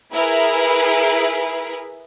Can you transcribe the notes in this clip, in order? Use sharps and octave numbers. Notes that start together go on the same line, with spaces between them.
E4 G#4 A#4 B4 B5